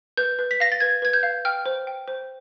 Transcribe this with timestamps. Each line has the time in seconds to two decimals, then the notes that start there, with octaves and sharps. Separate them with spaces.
0.17 B4 G6
0.39 B4
0.51 B6
0.60 F5 A#6
0.72 A6
0.80 B4 G#6
1.02 B4 G#6
1.13 G6
1.23 F5
1.45 G5 F6
1.66 C5
1.87 G5
2.08 C5